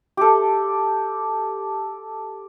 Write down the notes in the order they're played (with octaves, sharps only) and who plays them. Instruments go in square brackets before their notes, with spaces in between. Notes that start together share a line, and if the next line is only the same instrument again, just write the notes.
[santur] G4 A4